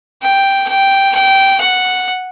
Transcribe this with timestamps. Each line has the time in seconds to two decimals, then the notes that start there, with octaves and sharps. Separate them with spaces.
0.22 G5
0.68 G5
1.15 G5
1.61 F#5